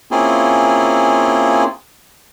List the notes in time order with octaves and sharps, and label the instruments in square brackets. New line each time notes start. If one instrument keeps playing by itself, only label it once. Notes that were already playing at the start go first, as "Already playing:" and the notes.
[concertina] A#3 C4 C#4 E4 F4 G#4